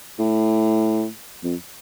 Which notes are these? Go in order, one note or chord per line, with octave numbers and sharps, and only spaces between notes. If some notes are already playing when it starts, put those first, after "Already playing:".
A2
F2